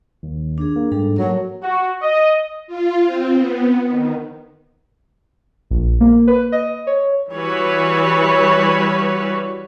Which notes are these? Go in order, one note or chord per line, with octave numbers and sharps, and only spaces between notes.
D#2
D4 G#4
A#3
G#2 G3 D4 A4
F#3 A3 A#3 A#4
F#4
D#5
F4
C4
B3
D#3
A#1
A#3
B4
D#5
C#5
E3 G3 F#4 B4 C#5